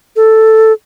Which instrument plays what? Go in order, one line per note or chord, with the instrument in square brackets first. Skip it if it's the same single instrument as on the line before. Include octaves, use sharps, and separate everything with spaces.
[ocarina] A4